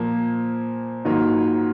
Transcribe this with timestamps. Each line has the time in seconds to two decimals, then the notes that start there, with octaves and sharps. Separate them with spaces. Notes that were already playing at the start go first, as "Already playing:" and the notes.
Already playing: A#2 F3 A#3
1.05 G#2 D#3 F#3 A#3 F4